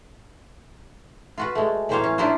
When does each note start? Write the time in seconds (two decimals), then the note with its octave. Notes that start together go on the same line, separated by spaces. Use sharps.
1.38 F4 F#4 B4
1.55 G#3 A3
1.89 A2 E3 A#3 C5 C#5 F5
2.04 C#4
2.18 D4 E4 F4 A#4 C5